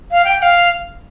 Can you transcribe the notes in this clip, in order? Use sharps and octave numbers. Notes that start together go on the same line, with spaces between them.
F5
G5
G5
F5